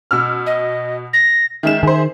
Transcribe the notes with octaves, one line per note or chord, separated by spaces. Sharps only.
B2 E6 F6
D#5
A#6
D#3 G#3 E5 E7
D#3 G#4 C5